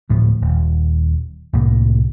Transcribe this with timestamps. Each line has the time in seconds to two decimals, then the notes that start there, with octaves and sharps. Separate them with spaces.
0.09 D2 A2 F3
0.41 D#1
1.53 C2 A2 A#3